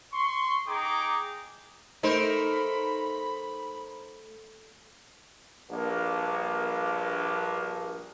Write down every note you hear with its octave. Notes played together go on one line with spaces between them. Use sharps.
C6 C#6
D#4 G#4 G5 A#5 D6
A3 D#4 A#4 C5 B5
A#1 G2 A#3 D4 A#4